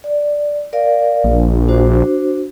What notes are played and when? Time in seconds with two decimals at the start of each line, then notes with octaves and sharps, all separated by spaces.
0.04 D5
0.73 A#4 D5 F5
1.24 A#1
1.68 D4 F#4 C5